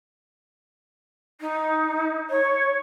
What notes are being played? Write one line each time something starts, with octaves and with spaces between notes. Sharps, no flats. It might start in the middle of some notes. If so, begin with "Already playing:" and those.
D#4
C#5